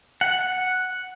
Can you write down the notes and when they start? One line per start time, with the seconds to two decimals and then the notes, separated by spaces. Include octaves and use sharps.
0.21 F#5